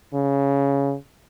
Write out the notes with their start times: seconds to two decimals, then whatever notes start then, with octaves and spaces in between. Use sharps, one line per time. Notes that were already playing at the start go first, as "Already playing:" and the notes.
0.14 C#3